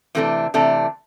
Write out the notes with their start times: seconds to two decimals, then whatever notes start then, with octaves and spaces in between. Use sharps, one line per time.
0.15 C3 E3 A3 D4
0.54 C3 E3 A3 D4